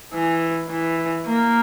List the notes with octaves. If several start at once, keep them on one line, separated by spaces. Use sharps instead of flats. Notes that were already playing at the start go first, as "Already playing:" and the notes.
E3
E3
A#3